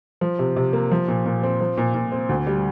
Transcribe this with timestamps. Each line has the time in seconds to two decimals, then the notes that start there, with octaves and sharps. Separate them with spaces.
0.21 F3
0.39 C3
0.56 C3
0.73 A#3
0.91 F3
1.08 A#2
1.26 A#2
1.43 C4
1.61 F3
1.77 A#2
1.94 A#2
2.12 C4
2.29 D2
2.47 G3